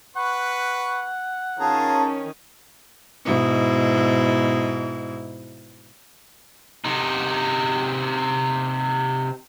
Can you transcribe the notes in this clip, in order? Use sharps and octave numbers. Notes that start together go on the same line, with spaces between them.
B4 F#5 C#6
D#3 C#4 F4 G#4 A5 A#5
G#2 B2 E4
C3 D#4